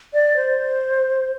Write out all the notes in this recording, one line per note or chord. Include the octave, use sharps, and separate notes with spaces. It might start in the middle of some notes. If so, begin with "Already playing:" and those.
D5
C5